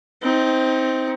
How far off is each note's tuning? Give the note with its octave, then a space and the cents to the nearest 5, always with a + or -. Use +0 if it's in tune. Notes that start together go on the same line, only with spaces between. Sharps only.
C4 +0 D#4 +30